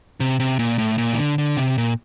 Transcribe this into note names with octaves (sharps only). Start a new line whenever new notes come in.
C3
C3
A#2
A2
A#2
E3
D3
D3
C3
A#2